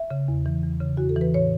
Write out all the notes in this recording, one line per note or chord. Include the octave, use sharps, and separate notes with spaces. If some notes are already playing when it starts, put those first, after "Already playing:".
Already playing: E5
C#3
E2
E3
E2
C#3
E2 F#4
A4
E3
B4
A2 C#5